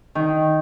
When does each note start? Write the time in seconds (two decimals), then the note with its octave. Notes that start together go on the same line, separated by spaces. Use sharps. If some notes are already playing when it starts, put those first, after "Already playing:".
0.15 D#3